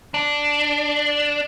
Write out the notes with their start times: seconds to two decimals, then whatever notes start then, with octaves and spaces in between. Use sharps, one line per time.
0.14 D4